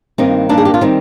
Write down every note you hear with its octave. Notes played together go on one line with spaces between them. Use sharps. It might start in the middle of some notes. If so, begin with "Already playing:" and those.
G2 D#3 A#3 C4 D#4
A#3 D4
G#4
G4
F4
D#3 G3 C4 D#4